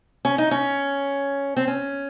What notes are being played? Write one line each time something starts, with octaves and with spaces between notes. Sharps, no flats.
C#4
D#4
C#4
C4
C#4